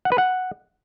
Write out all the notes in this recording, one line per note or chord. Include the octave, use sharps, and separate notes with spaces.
F#5
B4
F#5